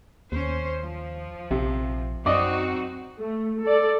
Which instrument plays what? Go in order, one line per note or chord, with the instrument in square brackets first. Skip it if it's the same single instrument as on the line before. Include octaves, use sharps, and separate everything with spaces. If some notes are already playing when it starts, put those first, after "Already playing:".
[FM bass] D#2 [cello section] C#4 C5
[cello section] F3
[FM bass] A#1 [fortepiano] C3
[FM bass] F#2 [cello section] C4 D#4 F#4 [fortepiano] D5 D#5
[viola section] A3
A4 D5